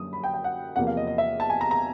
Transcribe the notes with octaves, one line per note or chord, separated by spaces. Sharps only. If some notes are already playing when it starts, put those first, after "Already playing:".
Already playing: F#2 D3 G3 A#3 D#6
B5
G5
G5
F#5
E2 C3 F3 A#3 F#5
F5
D#5
D#5
E5
A5
G#5
A#5
A#5